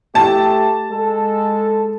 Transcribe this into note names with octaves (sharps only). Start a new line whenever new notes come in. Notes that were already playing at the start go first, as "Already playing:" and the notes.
A3 G4 A5
G#3 A4